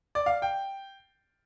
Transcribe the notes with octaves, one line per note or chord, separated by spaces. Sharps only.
D5
F5
G5